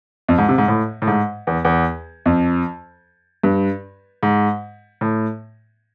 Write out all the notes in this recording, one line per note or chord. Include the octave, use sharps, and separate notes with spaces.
F2
G#2
C3
G#2
A2
A2
G#2
E2
E2
F2
G2
G#2
A2